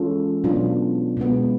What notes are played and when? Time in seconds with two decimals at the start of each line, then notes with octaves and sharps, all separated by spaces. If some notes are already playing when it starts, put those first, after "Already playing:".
Already playing: E3 G#3 C#4 F4 A4
0.44 B2 F#3 B3 D4 F4
1.17 B2 G#3 B3